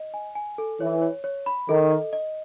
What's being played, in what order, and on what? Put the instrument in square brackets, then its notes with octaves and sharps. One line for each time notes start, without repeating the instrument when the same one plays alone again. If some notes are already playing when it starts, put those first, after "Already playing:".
Already playing: [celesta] D#5
G#5
G#5
A4
[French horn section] E3 [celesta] C#5
[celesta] C#5
C#5
B5
[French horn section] D#3 [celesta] A4
[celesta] D#5
D#5